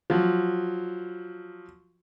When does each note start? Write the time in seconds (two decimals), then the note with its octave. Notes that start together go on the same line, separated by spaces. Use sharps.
0.10 F3 F#3